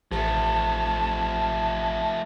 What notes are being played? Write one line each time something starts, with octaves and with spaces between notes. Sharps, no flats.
A1 F3 A3 A5